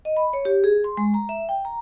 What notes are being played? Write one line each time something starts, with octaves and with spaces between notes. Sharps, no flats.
D#5
B5
C#5
G4
G#4
C6
G#3
A#5
E5
G5
A#5